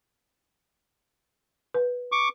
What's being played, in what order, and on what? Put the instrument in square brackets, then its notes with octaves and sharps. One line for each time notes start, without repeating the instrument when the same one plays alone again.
[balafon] B4
[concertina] C#6 D6